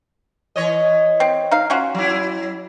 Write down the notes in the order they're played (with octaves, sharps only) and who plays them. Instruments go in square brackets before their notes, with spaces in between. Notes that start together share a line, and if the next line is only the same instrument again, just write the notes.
[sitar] E3 C#5 D#5
[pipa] C4
D#4 F5
C#4 F4 F#4
[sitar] F#3 E4